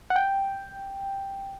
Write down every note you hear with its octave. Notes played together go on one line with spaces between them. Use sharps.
F#5
G5